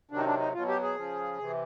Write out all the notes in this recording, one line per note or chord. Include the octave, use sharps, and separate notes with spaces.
C3 D#3 F#3 D4
D#4
D4
D#4
B2 F#3 F4
G4
G#4
C#3 F3
C3 E3